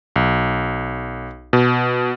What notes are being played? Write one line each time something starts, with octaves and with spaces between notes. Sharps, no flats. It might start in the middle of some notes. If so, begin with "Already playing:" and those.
B1
B2